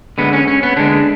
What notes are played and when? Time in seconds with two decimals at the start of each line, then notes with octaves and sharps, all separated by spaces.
0.18 D3 G#3 B3
0.33 C#4
0.48 C#4
0.63 B3
0.76 D3 G#3 D4